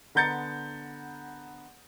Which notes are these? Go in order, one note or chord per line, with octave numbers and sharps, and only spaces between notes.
D3 B3 A#5 G6 A6 C#7